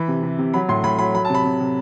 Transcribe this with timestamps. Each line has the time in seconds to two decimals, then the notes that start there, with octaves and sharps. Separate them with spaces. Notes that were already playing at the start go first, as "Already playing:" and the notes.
Already playing: E3 B5
0.08 C3
0.23 C3
0.38 C3
0.54 F#3 B5
0.69 A2 C6
0.84 A2 B5
0.98 F#3 B5
1.14 F#3 B5
1.25 A5
1.30 C3 B5
1.45 C3
1.60 C3